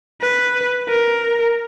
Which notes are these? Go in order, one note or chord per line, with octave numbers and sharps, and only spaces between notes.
B4
A#4